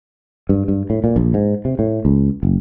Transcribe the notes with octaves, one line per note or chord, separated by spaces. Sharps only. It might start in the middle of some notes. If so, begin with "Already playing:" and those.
G2
G2
A2
A#2
A#1
G#2
C3
A2
C#2
F#1